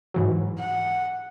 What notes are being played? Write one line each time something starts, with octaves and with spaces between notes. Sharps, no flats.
G#2 E3 F#3
F#5